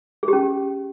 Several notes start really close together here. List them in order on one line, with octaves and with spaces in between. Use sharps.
G#4 G4 C#4